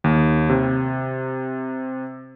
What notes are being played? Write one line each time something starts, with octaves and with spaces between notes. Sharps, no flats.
D#2
C3